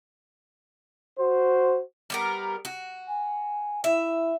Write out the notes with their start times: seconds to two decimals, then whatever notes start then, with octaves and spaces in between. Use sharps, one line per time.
1.18 F#4 C5
2.10 G3 B3 A#4
2.65 F#4
3.08 G#5
3.84 E4 E5